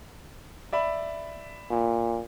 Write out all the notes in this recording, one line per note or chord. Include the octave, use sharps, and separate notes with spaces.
D5 E5 B5
A#2